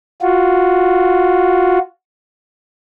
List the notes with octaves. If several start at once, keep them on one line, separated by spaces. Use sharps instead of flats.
F4 F#4